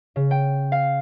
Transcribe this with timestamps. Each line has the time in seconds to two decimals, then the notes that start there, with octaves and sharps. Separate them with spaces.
0.16 C#3
0.31 G5
0.72 F5